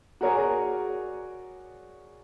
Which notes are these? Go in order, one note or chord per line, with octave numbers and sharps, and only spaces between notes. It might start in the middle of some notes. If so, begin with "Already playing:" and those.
F#4 G#4 A#4 C#5 D5 G#5